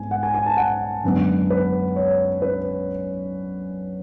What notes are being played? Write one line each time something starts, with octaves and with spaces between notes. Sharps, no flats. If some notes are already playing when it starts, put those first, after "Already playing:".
Already playing: G#2 G#3 B3 G#5
F#5
G#5
G#5
A5
F#5
F#2 D3 G#3 B3
B4
C#5
B4